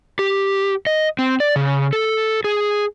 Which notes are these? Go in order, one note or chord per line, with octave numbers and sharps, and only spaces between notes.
G4
D#5
C4
D5
C#3
A4
G#4